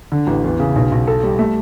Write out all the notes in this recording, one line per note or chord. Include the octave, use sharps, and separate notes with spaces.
D3
A1
E2
C#3
B1
B1
A4
G3
A3